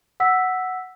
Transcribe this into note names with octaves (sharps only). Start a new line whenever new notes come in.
F#5 E6 B6